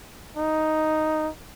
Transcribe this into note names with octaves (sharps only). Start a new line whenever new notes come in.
D#4